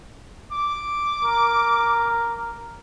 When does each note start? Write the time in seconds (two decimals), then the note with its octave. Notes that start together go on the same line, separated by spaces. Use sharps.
0.52 D6
1.25 A#4